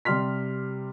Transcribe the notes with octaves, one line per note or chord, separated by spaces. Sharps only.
C3 G3 C6 F6 B6